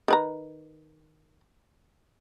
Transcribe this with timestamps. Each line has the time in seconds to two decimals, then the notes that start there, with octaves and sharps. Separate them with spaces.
0.08 D#3 B4 A#5